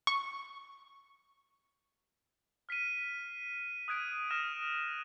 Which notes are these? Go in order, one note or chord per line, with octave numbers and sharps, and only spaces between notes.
C#6
F6 B6 C7 D#7
D#6 F#6 G#6 D7 D#7
D#6 F6 A#6 E7